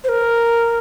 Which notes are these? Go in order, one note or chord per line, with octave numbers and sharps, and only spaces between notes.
C5
A#4